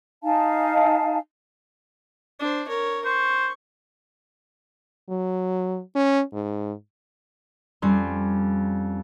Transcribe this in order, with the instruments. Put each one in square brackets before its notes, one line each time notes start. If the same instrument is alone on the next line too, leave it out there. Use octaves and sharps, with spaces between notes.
[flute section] D#4 F5 G#5 A5
[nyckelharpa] D4 C5
A#4 C#5
[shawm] C5 [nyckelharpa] C#6
[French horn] F#3
C#4
G#2
[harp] F2 G3 C#4 C6